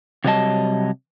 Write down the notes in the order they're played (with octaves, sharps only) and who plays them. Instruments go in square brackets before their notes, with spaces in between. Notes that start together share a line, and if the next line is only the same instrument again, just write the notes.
[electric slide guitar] C3 F#3 G3 A3 D#5 A5